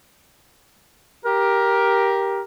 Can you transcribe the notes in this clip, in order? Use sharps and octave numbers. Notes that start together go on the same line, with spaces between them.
G4 A#4